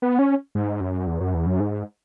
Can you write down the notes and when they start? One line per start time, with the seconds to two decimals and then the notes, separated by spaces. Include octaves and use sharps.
0.02 B3
0.19 C#4
0.55 G#2
0.80 F#2
1.07 E2
1.20 F#2
1.34 E2
1.46 F#2
1.60 G#2